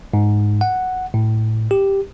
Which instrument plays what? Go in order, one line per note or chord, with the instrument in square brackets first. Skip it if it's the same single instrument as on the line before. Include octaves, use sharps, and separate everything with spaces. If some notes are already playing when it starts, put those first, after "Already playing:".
[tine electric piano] G#2
F#5
A2
G4